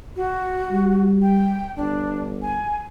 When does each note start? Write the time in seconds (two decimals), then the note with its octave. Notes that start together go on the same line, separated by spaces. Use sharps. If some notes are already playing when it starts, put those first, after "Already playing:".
0.16 F#4
0.71 G3
1.22 G5
1.77 G1 D4
2.42 G#5